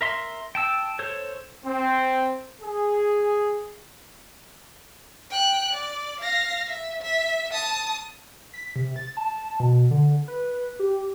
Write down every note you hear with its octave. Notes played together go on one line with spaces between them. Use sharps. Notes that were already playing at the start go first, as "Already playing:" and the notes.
A#4 E5 C6
G5 A5 E6
A4 C5 C#5
C4
G#4
G5 F#6
D5
F5 A#6
E5
E5
A5 D#6
B6
C3
A6
A5
B2
D3
B4
G4